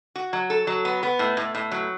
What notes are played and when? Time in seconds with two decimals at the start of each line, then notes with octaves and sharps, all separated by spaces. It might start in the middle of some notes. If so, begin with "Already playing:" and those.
0.16 F#4
0.33 F#3
0.50 A4
0.67 F#3
0.85 B3
1.03 B3
1.19 A2
1.37 A2
1.55 A2
1.71 F#3